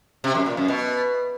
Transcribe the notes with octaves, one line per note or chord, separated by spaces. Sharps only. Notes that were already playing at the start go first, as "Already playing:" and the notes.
C3
F#2
A#2
F#2
B2